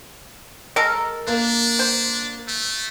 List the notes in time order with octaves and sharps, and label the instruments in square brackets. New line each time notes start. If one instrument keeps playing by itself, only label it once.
[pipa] G#3 A4 [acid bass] A#4
[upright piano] A#3 [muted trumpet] D4
[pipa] C5
[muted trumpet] A3